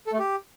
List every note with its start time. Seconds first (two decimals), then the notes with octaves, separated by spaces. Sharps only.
0.07 A4
0.13 A3
0.19 G4